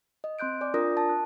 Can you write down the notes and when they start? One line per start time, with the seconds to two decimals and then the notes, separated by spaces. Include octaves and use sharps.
0.24 D#5
0.39 C4 C6 F#6 G6 D7
0.61 D5 G#5 D6 G6
0.74 D4 F4 A#4 D5 D#6 A#6
0.97 A5
1.09 F#6